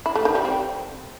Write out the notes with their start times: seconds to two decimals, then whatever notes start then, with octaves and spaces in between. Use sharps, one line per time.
0.06 E4
0.15 A3
0.25 D#3
0.35 G3
0.45 C4